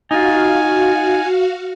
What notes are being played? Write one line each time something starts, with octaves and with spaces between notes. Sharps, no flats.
D#4 F4 F#4 F5 G#5